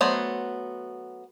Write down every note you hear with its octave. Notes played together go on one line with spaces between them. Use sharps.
F#3 A3 B3 C5